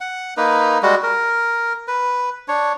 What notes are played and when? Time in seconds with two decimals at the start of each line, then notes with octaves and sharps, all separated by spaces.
0.01 F#5
0.37 A#3 D#4 B4
0.83 G3 G#3 F#4
1.03 A#4
1.88 B4
2.48 D4 C#5